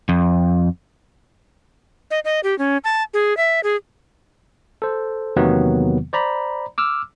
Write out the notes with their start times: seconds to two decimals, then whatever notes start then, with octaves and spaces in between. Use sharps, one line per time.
0.09 F2
2.11 D#5
2.25 D#5
2.44 G4
2.59 C#4
2.84 A5
3.14 G#4
3.37 E5
3.64 G#4
4.82 A4 C5
5.36 E2 C3 D#3 F#3 A#3 B3
6.13 C5 D5 A#5 B5
6.78 D6 E6 F6